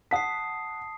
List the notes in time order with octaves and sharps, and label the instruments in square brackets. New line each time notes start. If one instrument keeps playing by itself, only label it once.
[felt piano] F#5 B6 [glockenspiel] A5 D#6 C7